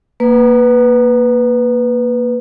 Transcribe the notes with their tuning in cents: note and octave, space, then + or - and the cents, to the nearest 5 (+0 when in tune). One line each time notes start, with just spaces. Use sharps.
A#3 +0 B4 +0